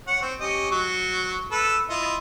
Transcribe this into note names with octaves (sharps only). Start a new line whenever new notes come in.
C#5 F#5
C4
C#4 G4 D#5
F#3
A4 B4 E6
E4 F4 D#5